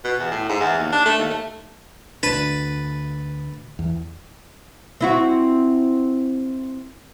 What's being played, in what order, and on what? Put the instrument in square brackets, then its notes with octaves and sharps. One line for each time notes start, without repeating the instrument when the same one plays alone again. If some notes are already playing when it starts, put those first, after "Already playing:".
[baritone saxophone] B2
E2
A2
G#2
E2
D#2
D4
A3
D#2
A3
[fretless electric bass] D2 D4 [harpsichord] B4 A5
[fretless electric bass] E2
[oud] C4 E4 F#4